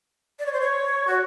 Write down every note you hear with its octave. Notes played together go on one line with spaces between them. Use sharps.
D5
C#5
C5
C#5
F#4